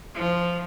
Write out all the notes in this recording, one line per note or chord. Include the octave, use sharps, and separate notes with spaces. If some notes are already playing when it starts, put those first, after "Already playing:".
F3